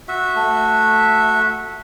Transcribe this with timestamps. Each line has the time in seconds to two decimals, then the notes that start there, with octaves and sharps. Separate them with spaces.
0.08 F#4 E5
0.36 A3